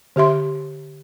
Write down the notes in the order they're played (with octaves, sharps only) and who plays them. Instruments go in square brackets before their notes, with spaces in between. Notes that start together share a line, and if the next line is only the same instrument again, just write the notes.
[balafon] D3 G4 E5 C6